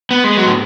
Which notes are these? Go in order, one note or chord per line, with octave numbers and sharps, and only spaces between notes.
B3
G#3
F#3
A2